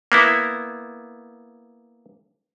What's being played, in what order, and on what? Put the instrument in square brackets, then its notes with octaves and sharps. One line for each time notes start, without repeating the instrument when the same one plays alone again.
[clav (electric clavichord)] A#3 B3 E4